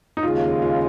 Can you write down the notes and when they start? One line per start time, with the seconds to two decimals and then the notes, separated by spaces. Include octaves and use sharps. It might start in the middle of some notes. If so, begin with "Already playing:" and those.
0.17 D#4
0.23 D#2 C#3 G#3 F4
0.62 F4